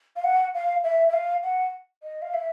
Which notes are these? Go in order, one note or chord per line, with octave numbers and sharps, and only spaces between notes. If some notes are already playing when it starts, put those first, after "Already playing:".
F5
F#5
F5
E5
E5
F5
F#5
D#5
F5
E5